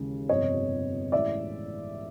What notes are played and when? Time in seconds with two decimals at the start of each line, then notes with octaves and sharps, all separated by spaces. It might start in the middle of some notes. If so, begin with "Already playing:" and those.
Already playing: D#2 C#3 E3 G#3
0.29 G1 F2 C3 C#5 D#5
1.12 A1 A2 E3 G#3 D5 E5